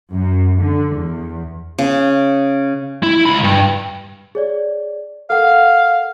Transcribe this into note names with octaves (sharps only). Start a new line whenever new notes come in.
F#2
D3
E2
C#3
E4
C#2 B5
G2
G#4 C#5 D5
A4 A#4 F5 F#5